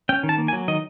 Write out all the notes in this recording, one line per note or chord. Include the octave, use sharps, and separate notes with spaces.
C#4 G5
D#3
A5
A#3
G#5
F#3
D#3 D#5